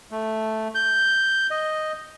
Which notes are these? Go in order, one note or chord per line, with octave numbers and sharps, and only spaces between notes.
A3
G6
D#5